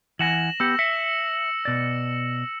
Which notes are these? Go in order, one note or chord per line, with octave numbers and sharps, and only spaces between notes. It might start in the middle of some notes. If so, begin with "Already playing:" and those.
E3 F#5 G#5 A#6 E7 F#7
B3 G4 E6 C#7
E5 C#7
B2 D5